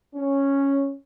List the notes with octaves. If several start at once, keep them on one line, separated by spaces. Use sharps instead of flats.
C#4